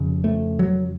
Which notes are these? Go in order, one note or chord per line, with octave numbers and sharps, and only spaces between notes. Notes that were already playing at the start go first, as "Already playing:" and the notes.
Already playing: F2 C#3
A3
F#3